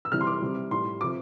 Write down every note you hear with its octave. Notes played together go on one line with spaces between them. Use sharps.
E6
C3 E3 G3 F6
C6
D6
C3 G3
A2 G3 C6
C3 F3 D6